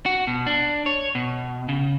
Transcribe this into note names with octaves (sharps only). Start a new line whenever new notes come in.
F#4
B2
D4
C#5
B2
C#3